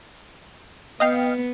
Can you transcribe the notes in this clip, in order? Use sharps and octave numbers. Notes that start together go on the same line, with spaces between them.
B3 D#5 F5 G5